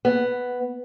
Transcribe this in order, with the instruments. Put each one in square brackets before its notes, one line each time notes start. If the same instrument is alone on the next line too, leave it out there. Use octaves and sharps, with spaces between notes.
[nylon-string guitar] B3